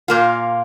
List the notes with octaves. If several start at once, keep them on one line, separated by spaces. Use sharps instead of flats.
A#2 A#3 F4